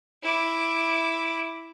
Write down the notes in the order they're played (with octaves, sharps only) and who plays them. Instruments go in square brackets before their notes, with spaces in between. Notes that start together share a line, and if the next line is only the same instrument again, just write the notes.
[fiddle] E4 D6